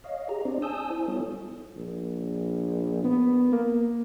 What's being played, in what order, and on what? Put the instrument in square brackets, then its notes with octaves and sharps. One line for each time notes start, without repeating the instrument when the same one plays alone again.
[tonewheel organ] C#5 D#5 F5
G4 G#4 A#5
C4 D4 C5 D5
G#5 A5 D#6 E6 G6
E4 C5
G3 B3 D#4 F4 A4 C#5
[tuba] A#1
B3
A#3